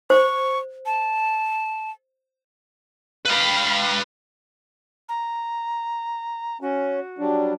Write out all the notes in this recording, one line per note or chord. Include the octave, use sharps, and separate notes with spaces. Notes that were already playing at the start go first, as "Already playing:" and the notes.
C5 C#6
A5
B4 F5 G5 B5
A#5
C#4 F#4
F#3 G3 D4